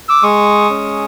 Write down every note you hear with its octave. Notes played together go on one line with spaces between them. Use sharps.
D6 E6
G#3 C#6 D#6
C#4